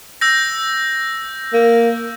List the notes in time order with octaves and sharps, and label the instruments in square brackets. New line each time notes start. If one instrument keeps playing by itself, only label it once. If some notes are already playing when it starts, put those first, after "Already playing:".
[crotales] E6 G6 A#6
[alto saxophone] A#3